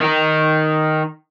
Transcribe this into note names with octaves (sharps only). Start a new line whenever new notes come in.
D#3 D#4